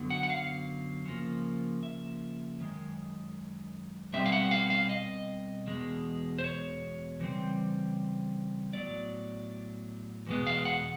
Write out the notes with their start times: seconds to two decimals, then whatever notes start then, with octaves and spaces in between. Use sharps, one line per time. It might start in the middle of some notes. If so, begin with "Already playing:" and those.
Already playing: F#2 D3 F#3 B3
0.10 F#5
0.23 F#5
0.30 F5
1.06 C#3 F3 A#3
1.83 E5
2.60 F#2 D#3 G#3
4.13 B2 G3 C4 E5
4.26 F5
4.32 F#5
4.51 F5
4.70 F5
4.89 D#5
5.67 E2 B2 G#3
6.38 C5
6.44 C#5
7.20 C#3 E3 G3 C4
8.73 A2 F#3 B3 D5
10.27 E2 B2 G#3 B3
10.47 F5
10.65 F#5